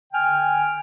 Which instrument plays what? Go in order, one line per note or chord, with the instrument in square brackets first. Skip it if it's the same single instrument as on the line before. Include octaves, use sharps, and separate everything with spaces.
[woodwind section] D3 G5 G#5 F6